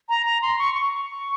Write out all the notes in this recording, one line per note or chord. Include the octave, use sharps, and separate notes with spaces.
A#5
A#5
C6
C#6
C#6